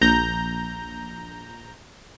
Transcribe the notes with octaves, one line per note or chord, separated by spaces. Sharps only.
A#1 A#5 G6